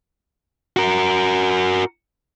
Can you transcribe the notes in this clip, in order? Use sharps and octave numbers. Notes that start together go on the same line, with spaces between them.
F#4 A#4